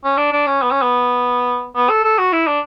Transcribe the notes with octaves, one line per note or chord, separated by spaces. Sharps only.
C#4
D4
D4
C#4
B3
C#4
B3
B3
A4
A4
F#4
E4
D4